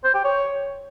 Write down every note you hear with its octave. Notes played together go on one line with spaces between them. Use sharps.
C5
G4
C#5